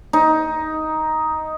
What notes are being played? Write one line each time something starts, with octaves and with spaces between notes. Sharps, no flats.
D#4